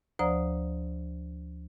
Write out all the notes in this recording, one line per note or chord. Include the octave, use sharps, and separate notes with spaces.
D2 F3 C5 D5 A#5 D#6